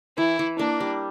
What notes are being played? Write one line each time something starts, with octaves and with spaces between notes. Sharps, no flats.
E3 E4
E3
A#3 D4
G3